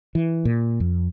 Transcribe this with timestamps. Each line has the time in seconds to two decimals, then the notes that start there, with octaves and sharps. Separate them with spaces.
0.15 E3
0.45 A#2
0.80 F2